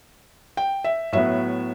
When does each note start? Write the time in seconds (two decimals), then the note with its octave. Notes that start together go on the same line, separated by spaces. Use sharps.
0.57 G5
0.84 E5
1.12 A2 F#3 B3 E5